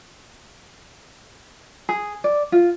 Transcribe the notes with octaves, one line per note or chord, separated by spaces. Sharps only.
G#4
D5
F4